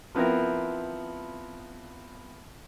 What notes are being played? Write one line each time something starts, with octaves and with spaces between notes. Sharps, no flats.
F3 B3 C4 E4 A#4